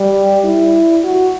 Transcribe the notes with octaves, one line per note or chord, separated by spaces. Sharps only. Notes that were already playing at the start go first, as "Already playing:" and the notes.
Already playing: G3
E4
F#4